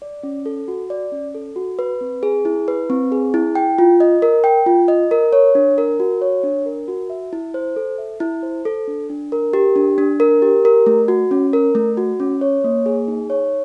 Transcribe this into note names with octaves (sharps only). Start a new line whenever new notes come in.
D5
C#4
A4
F#4
D5
C#4
A4
F#4
B4
C4
G#4
E4
B4
C4
G#4
E4
G5
F4
D#5
A#4
G5
F4
D#5
A#4
C#5
D4
A#4
F#4
C#5
D4
A#4
F#4
E5
E4
C5
A4
E5
E4
C5
A4
D4
D4
A#4
G4
D4
D4
A#4
G4
A#4
A3
F#4
C#4
A#4
A3
F#4
C#4
C#5
A#3
G#4
D#4
C#5